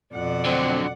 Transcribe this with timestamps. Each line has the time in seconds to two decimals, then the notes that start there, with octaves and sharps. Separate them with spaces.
0.14 F2 B2 D5 F#5
0.45 D3 F#3 C4